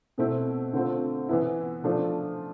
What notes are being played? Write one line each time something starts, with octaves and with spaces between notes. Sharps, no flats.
B2 A3 C4 E4
D3 A3 C4 F4
E3 B3 E4
F3 A3 D4 F4